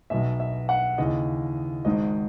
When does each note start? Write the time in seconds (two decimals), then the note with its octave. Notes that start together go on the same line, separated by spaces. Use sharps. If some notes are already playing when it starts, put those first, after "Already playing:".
0.10 B1 B2 E5
0.40 E5
0.69 F#5
0.98 D#2 C#3 E3 D#5
1.85 G#1 G#2 D#3 D#5